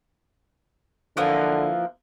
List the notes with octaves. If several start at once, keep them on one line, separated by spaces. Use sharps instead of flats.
D3 E3 F3 A#3